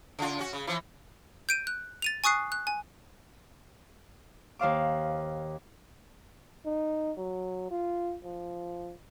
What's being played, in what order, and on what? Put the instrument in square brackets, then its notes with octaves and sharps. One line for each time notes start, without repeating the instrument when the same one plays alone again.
[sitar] C#3 F4
C#4 F#4
C#3
E3 F3
[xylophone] G6 D7 D#7
F#6
A6 D#7 F7
G#5 C#6 D#6 F#6 C7
F#6
G#5
[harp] D#2 C5 F5 D6
[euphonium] D#4
F#3
F4
F3